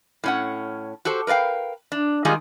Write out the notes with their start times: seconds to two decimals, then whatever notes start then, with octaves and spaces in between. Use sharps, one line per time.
0.24 A2 C#4 F#5
1.05 F#4 G4 A4 C5
1.27 A#4 B4 D5 F5 G5
1.92 D4
2.25 D#3 G3 G#3 D#4 F4 G#4